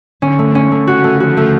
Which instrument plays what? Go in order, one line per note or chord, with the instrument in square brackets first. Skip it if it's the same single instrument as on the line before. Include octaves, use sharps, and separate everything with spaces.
[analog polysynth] D3 [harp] C#4
[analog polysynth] D3 [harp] A3
[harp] C#4
[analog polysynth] D3
[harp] A3
[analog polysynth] C#3 [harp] F#4
[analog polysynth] C#3 [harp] A3
[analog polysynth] F3 [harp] F#4
[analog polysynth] F3 [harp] A3